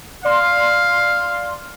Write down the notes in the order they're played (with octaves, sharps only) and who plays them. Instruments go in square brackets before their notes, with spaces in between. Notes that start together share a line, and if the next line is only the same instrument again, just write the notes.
[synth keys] D5 C6 [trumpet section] F5